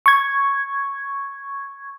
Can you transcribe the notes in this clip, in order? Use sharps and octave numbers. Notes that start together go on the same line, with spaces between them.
C#6 G#6